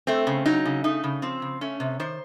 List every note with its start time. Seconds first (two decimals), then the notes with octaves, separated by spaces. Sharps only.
0.07 A3 C4
0.27 C#3
0.46 F#3 D#4
0.65 C#3
0.84 A3 D#4
1.04 C#3
1.22 F3 C4
1.42 C#3
1.61 A3 C#4
1.80 C3
2.00 D#3 C5